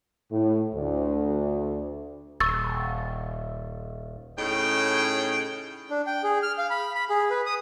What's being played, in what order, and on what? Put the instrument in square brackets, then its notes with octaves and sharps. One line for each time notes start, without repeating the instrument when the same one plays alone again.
[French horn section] A2
D2
[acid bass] D#1 [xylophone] C#6 E6 A6
[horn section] A2 C#3 D#4 G#4 G5
[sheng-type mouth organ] D4
G5
G#4
F6
F5
B5
B5
G#4
B4
D#6